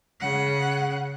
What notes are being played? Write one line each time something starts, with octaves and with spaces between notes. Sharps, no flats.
C#3 F#5